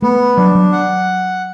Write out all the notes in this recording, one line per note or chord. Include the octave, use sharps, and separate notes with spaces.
A3 B3
F#3 D4
F#3
F#5